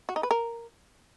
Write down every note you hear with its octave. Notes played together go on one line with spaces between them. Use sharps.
F#4
D#4
B4
A#4